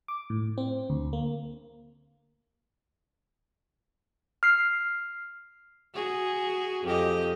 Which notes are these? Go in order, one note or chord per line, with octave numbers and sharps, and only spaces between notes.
D6
A2
C4
D2
A#3
F6 C7
F#4 G#4
F2 G4 D#5